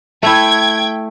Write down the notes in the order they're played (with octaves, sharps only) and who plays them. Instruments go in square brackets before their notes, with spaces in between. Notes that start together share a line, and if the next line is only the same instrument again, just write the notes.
[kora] A3 E4 [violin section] G5 G#6